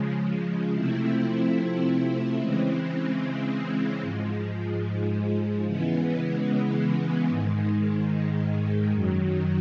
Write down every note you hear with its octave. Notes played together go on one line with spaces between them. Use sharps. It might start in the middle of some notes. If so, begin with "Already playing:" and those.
Already playing: C#3 F3 G#3
C3 F3 A3 C4 E4
C#3 E3 G#3 C4
G#2 F3 G#3
C#3 E3 G#3 B3
G#2 D#3 G#3
F#2 D#3 F#3